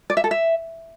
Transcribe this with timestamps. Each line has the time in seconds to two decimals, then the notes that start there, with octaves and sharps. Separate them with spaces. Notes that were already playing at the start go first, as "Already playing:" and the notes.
0.10 D5
0.17 E5
0.24 A4
0.31 E5